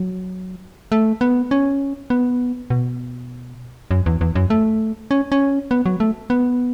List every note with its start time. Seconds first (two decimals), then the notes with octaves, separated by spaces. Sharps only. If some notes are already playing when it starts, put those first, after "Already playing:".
Already playing: F#3
0.92 A3
1.21 B3
1.51 C#4
2.10 B3
2.70 B2
3.91 F#2
4.06 E2
4.21 E2
4.35 F#2
4.50 A3
5.11 C#4
5.32 C#4
5.71 B3
5.86 F#3
6.00 A3
6.30 B3